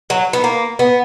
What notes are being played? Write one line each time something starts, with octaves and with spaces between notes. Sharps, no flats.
F#3
B3
A#3
B3